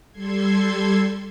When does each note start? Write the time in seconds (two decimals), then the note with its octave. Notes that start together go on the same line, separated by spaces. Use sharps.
0.12 G3 A4 C6 G#6